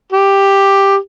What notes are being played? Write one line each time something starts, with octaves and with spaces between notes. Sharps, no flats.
G4